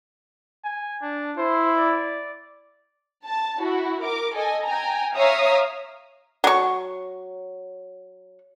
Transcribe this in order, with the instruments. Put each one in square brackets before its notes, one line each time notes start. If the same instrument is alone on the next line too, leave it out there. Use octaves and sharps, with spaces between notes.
[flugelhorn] G#5
D4
[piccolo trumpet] E4 [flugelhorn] C5
[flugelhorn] D5
[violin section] A5
E4 F#4
A#4 D6
A4 D#5 G#5
G5 G#5 A#5
C#5 E5 F5 A#5 D#6
[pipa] F#3 C#6